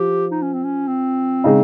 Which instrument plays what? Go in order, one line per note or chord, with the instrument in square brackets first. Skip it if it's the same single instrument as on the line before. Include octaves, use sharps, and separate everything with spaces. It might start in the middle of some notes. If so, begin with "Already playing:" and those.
Already playing: [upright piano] F3 [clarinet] G4
[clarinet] D#4
C#4
C4
C#4
C4
[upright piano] C#3 G#3 D#4 G#4